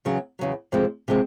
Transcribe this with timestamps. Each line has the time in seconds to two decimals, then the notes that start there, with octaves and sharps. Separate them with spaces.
0.05 E2 C#3 F#3
0.39 E2 C#3 F#3
0.72 F2 C3 F3 G#3 C4
1.08 C3 F3 G#3 C4